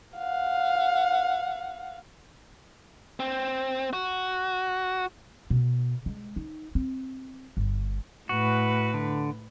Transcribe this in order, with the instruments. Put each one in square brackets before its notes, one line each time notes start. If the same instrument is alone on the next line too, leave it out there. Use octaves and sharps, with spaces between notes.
[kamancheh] F5 F#5
[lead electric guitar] C4
F#4
[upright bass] B2
G#3
D#4
C4
G1
[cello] A2 B4 [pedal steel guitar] F#4
[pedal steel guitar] D3